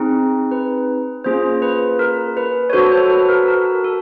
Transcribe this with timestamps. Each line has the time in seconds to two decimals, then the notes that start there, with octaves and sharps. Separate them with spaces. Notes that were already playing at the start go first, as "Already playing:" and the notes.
Already playing: C4 D#4 G#4
0.51 B4
1.24 A#3 C#4 F4 G#4 C5
1.62 B4
1.99 A#4
2.37 B4
2.70 C#5
2.73 D4 F#4 A4 C5
2.92 C5
3.10 B4
3.29 A#4
3.48 A#4
3.84 A4